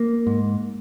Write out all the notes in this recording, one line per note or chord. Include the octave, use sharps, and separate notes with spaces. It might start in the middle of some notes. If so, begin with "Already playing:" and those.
Already playing: A#3
G#2